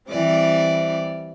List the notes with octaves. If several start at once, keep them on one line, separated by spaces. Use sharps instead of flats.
E3 G3 C4 D5